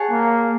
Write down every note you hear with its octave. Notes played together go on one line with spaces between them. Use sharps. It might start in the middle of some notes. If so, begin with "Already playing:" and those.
Already playing: G#4 C#5 F#5 A5
A#3